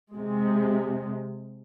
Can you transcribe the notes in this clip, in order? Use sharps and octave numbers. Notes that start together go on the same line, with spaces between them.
C3 G#3